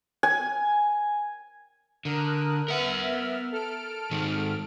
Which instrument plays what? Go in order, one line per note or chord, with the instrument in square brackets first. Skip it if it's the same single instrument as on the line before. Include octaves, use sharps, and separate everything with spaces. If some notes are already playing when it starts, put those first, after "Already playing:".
[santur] G#5
[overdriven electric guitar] D3 [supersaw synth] A#4 D#6 F#6
[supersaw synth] B3 E5 F6 [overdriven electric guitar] A#4 F#5
[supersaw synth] A4 F6 D7
[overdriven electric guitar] G#2 D#3